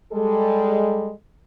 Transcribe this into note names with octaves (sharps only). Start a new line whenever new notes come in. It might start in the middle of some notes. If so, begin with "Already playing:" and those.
G3 G#3 A4